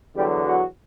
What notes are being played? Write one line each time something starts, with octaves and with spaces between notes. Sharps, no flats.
E2 D3 F#3 G3 G4
F#3 F#4